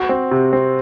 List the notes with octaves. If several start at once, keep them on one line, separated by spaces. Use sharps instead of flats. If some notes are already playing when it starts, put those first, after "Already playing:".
Already playing: F#4
C4
C3
C4